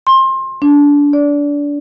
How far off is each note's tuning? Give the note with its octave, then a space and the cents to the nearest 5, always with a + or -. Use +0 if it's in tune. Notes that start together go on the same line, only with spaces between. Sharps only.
C6 +25
D4 -25
D5 -25